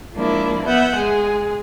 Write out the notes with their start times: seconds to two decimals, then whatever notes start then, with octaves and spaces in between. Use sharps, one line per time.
0.15 F3 G#3 A#3 D4 E4
0.66 B3 E5 F#5 G6
0.95 G#3 G#4